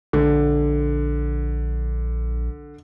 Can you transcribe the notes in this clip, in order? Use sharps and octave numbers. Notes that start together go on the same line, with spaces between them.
A#1 D3